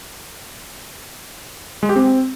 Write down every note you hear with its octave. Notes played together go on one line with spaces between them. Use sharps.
G#3
G4
C4